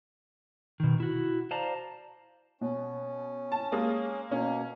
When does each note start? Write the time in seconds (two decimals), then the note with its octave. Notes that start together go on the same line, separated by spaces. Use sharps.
0.80 B2 D#3
1.00 E4 F#4
1.51 C5 D5 F5 A5 A#5
2.61 B2 C#4
3.52 A5
3.72 G#3 A#3 D#6
4.31 B2 A#3 C#4